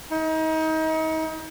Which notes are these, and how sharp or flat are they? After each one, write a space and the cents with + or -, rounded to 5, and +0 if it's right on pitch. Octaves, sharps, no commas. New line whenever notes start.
D#4 +35